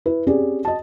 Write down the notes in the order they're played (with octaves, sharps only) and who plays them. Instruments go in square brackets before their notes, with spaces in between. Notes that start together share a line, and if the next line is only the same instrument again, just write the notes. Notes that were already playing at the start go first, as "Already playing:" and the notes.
[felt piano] E4 B4
C4 C#4 G4 G#4 D5
D#5 A5